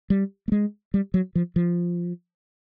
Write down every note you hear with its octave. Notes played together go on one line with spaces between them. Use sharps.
G3
A3
G#3
G3
F#3
F3
F3